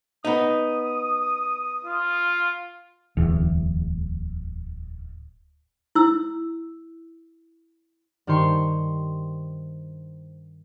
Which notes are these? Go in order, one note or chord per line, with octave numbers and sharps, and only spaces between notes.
B3 D#4 D#6
F4
D1 E2
E4 E6
G2 D#3 G4 C5 C6 C#6